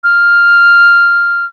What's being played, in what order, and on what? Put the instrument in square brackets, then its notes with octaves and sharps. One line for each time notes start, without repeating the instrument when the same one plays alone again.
[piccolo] F6